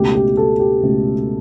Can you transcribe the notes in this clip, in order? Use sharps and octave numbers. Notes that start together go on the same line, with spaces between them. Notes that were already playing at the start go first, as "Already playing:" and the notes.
Already playing: C#2 B2 A3 G4
G4
A4
G4
C#2 B2 A3